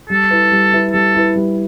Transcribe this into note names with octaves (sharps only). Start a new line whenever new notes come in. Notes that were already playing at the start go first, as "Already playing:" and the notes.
G3 A4
E4 B4
G3
E4 B4
G3 A4
E4 B4
G3